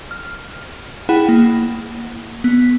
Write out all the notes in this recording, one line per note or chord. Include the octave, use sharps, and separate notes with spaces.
F6
E4 G#4 F#5 G5 B5 F#6
A#3
B3